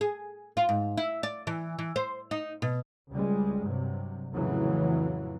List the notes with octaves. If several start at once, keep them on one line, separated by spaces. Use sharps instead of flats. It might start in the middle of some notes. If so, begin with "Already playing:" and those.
G#4
F4
G#2
E4
D5
E3
E3
C5
D#4
B2
C#2 G3 G#3
G2 C3 F#3
F2 A2 C#3 E3 F#3